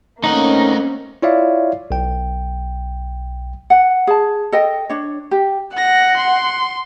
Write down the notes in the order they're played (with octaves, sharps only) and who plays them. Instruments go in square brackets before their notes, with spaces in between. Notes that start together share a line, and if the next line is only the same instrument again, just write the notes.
[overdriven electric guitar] A3 F#5 [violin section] A#3 C4 C#4 [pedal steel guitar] D#4
[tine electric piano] E4 F4 C#5 D5 E5 F5
B1 G5
[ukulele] F#5
G#4 A5
A4 D#5 G5
D4 C#5
G4
[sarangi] F#5 [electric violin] A#6
[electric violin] C6